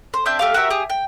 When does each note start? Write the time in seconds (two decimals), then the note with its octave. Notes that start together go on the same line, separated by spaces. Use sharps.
0.14 C5
0.26 C4 D4 E5 G6
0.39 A3 G4 F5
0.54 F#4 G4 A#4 E5
0.70 G4 G#4
0.90 G5